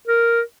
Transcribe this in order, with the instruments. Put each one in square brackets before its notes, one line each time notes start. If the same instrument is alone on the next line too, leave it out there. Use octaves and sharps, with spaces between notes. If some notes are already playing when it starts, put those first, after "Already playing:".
[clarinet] A#4